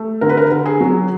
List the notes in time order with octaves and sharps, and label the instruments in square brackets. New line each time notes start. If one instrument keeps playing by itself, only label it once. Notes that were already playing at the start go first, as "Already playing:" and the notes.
Already playing: [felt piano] A3
D3 A#4
B4
A#4
D3
G#4
F#3